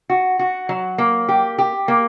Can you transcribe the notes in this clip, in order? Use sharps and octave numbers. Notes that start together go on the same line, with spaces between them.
F#4
F#4
F#3
A#3
G4
G4
A#3